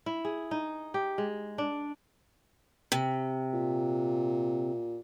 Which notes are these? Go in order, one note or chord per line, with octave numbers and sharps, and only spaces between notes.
E4
G#4
D#4
G4
G#3
D4
C3
A#2